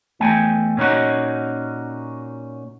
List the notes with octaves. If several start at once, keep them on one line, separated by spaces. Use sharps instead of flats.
E2 A3 G5 G#5
A#2 C#4 D#4 F#4